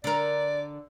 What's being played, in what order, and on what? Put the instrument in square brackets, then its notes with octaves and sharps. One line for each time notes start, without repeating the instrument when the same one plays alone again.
[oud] D3 A#4 [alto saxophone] D5